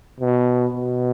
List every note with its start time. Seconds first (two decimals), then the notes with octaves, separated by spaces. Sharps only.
0.20 B2
0.72 B2